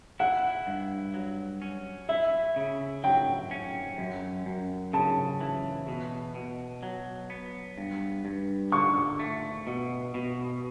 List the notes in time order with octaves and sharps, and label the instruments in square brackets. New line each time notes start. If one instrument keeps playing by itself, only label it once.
[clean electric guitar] E4 [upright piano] F#5
[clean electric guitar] G2
F#3
C#4
[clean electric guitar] E4 [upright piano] E5
[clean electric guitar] C#3
[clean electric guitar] F#3 [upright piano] G5
[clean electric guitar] C#4
F#2
F#2
[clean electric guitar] C#3 [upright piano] A5
[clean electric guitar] E3
B2
B2
F#3
B3
G2
G2
[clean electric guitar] D3 [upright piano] C#6
[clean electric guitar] A3
B2
B2